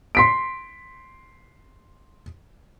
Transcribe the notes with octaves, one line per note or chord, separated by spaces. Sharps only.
C6 B6 D7